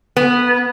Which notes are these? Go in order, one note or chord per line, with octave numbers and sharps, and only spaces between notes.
B3